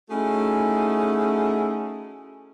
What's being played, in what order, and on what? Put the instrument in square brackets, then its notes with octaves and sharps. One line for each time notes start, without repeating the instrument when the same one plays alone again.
[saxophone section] A3 C#4 D#4 E4 F#4 G#4